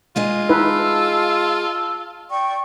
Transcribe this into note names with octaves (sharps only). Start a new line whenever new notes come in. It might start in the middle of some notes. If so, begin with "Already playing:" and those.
G#3 F4 G#4 D#5
D#4 E4 B4 A5 E6
D5 G5 C#6